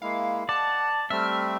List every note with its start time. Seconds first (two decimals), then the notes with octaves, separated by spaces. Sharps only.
0.02 G#3 A#3 E4 F5
0.49 D5 F#5 A5
1.10 G3 A3 C4 E5 F6